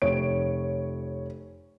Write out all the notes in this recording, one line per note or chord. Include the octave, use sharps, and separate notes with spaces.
F1 C#5 D7